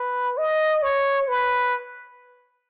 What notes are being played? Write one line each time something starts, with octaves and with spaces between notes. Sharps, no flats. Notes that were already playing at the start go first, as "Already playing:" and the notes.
Already playing: B4
D#5
C#5
B4